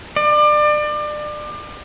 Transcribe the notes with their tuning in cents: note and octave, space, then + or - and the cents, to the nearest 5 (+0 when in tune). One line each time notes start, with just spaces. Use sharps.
D5 +30